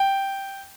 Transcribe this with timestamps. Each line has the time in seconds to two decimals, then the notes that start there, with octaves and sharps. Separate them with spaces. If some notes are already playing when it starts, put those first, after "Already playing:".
Already playing: G5